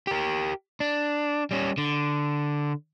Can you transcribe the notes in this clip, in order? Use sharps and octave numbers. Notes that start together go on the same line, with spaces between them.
G4 A#4
D4
G3 C#4
D3